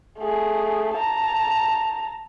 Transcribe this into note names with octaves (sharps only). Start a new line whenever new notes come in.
A3 G#4
A5 A#5